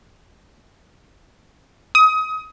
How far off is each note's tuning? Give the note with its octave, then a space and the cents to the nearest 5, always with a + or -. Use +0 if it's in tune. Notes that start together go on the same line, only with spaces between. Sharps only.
D#6 +25